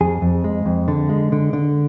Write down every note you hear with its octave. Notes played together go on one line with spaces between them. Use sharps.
F2 G#4
F2
G#3
F2
D3
G#3
D3
D3